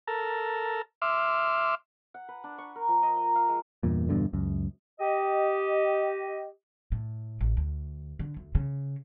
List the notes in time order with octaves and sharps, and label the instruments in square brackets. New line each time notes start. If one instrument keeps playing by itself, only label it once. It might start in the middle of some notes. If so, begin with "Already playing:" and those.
[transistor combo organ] A4 A#4
E5 C6 D6 F6
[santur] F#5
B4
D4
C#6
A#4
F3
D#5
A#5
F5
G#3
[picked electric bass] E2 G2 A#2
E2 G2 B2 D3
C#2 F#2
[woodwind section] G4 D#5
[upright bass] A2
A1
D2
D3
D2
C#3